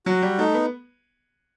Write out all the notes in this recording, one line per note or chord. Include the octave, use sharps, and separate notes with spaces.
F#3 F#4
G3
A3 D#4
B3